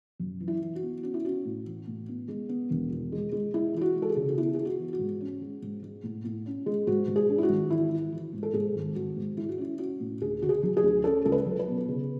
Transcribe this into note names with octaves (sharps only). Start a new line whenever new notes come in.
F#2
E3
E4
E3
F#4
B3
C#4 F#4
E4
C#4 F#4
A2
E3
A2
B3
G#3
B3
E1
E2
G#3
G#3
G#3 E4
E3 E4
F#4
G#3
A4
G#4
C#3
F#4
B3 E4
B3 G#4
F#4
E3
F#4
G#2
C#4
G#3
G#2
G#3
A2
A2
C#4
G#3
G#2 F#4
G#2
G#4
D4
E4
F#4
G#1
E3 E4
E4
E3
G#2
A4
G#2 G#4
G#1
G#1 F#4
G#2
G#3 E4
F#4
C#4 E4
C#4 F#4
A2
D2 G#4
D3 F#4
G#4
F#3
G#4
D2
C#4 A4
C#2 A4
B4
F#3
B4
B2
C#3